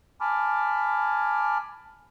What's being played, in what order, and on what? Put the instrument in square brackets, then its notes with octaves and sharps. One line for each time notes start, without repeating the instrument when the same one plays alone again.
[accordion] G#5 A5 B5 D6 F6